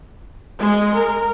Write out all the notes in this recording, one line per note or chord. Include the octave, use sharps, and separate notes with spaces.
G#3
A#4